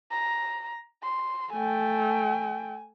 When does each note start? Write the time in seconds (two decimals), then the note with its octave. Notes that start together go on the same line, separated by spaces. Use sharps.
0.11 A#5
1.03 C6
1.53 A3 G5 G#5